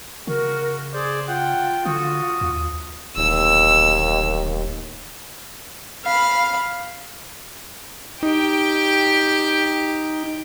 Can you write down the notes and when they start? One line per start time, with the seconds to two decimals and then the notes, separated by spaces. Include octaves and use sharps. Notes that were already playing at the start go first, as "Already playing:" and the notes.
0.27 C#3 F#4 A#4
0.93 G#4 C5 D5
1.27 F4 F#5 G5
1.86 D3 F#4 D#6
2.41 D#2
3.16 D1 D#2 E6
6.05 F5 B5
8.23 D#4 G4 G5